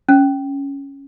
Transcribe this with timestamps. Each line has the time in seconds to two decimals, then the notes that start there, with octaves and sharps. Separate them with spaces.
0.09 C#4